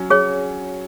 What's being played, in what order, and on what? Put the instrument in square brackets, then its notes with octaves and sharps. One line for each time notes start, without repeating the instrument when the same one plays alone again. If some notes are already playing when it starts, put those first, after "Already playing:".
Already playing: [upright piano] F#3 C#4
[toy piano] G#4 C#5